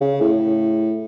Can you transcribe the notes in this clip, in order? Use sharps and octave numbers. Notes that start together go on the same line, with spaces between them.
C#3
A2